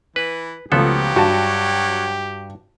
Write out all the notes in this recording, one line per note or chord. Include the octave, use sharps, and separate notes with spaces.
E3 B4
C#2 F3 F#3 A3 B3 G4 A4
G2 F#4 A5